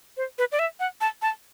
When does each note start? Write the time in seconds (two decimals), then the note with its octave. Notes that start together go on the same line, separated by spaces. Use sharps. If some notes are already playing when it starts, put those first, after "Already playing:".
0.17 C5
0.38 B4
0.52 D5
0.59 E5
0.80 F#5
1.01 A5
1.22 A5